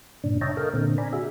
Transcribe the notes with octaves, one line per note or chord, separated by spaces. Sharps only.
G2 A#2 C#3 D4
C#5 D#5 E5 G5 A5 A#5
A4 A#4 D#5 F5 G5
A#2 D3 C4
D5 G#5 A#5 B5
F#4 G#4 E5